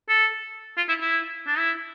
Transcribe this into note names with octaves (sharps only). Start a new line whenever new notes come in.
A4
F4
E4
E4
D4
E4